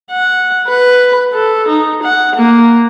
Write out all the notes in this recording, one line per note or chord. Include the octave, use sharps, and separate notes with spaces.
F#5
B4
A4
D#4
F#5
A#3